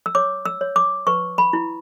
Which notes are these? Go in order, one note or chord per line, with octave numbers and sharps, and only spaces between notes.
E6
C#5 D6
E6
C#5
D6
B4 C#6
B5
E4